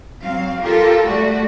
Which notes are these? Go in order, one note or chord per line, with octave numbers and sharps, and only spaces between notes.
F#3 C4 F5
F4 G4 A4 A#4
G3 A3 F#4 D5